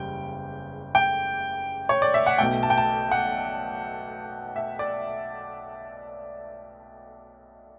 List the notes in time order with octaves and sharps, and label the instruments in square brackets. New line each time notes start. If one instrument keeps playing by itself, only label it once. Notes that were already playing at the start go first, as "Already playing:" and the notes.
Already playing: [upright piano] F#1 E2 C#3 G3 G5
G5
C#5
D5
E5
F#5
B1 B2 A3 G5
A5
G5
A5
F#5
E5
D5